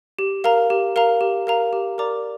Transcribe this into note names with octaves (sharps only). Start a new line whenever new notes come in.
G4
A#4 F5 A#5
G4
A#4 F5 A#5
G4
A#4 F5 A#5
G4
A#4 D5 A#5 D6